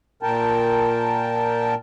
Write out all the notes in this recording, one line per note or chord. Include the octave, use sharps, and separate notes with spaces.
A#2 A#4 G5 A5